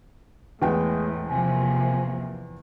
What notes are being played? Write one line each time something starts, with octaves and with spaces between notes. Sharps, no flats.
E2 A2 G#3 B3 G5
C3 F3 A#3 G#5